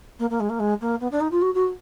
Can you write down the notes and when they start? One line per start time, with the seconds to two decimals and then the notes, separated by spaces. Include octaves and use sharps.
0.19 A#3
0.30 A#3
0.40 G#3
0.49 A#3
0.59 G#3
0.81 A#3
1.00 B3
1.11 D4
1.20 D#4
1.31 F4
1.41 F#4
1.54 F#4